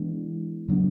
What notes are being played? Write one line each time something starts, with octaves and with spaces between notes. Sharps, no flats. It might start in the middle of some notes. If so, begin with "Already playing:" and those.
Already playing: E3 G#3 B3 D4
C#3 F#3 B3 D4